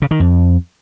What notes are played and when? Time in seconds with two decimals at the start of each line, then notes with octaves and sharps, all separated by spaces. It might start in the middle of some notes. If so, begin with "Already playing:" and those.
0.02 C#3
0.11 D#3
0.20 F2